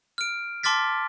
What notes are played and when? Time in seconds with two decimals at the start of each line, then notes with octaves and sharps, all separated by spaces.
0.18 F6 D7
0.63 A5 C6 D6 F6 A6 B6